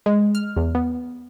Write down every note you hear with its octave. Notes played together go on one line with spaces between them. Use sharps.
G#3
F6
E2
B3